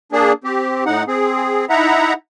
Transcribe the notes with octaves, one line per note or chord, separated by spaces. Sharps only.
A#3 D4 G#4
C4 G4
A2 D#4 F#5
C4 G#4
D#4 E4 E5 F#5 A#5